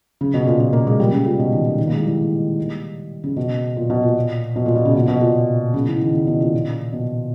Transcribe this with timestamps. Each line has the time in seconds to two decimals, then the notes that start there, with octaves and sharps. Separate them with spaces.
0.21 C#3
0.34 B2
0.47 A#2
0.60 B2
0.73 A#3
0.87 G#3
1.00 G3
1.12 C#3
1.26 A#2
1.39 B2
1.52 D#3
1.65 D#3
1.78 D#3
1.87 A#3
1.92 G#3
2.00 E3
2.05 G3
3.24 C#3
3.37 B2
3.77 A#2
3.90 B2
4.03 A#2
4.56 B2
4.66 A#2
4.76 B2
4.85 C#3
4.95 B2
5.08 B2
5.21 A#2
5.74 C#3
5.87 E3
6.01 D#3
6.14 C#3
6.27 B2
6.40 A#2
6.93 B2